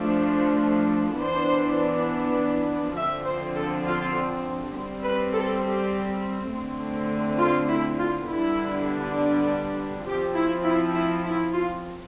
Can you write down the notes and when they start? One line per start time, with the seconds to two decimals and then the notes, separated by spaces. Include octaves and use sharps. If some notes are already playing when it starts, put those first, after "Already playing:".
Already playing: F3 A3 D4
1.19 E3 B3 D4 C5
2.96 D3 F3 C4 E5
3.26 C5
3.55 A4
3.84 F4
4.73 G3 G4
4.77 C4
5.03 B4
5.33 A4
5.62 G4
6.51 D3 A3 C4
7.39 F4
7.68 E4
7.98 F4
8.28 D3 G3 B3 D4 E4
10.05 F3 C4 G4
10.34 E4
10.64 E4
10.94 E4
11.24 E4
11.53 F4